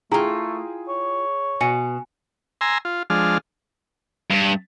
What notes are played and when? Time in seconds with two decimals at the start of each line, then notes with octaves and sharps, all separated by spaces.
0.11 A3 E4 F4 G#4 G5 A#5
0.88 C#5
1.61 B2 F#4 G#5 C#7
2.61 G#5 A#5 C6 E6
2.85 F4
3.10 F3 G#3 D4 F6
4.31 G2